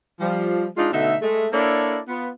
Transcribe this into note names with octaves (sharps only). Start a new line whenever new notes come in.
F3 G3
G#3 D4 D#4 F4
B2 D3 A3 D#4 E5
G#3 A3
A#3 D4 E4 A4 C#5 D5
B3 F4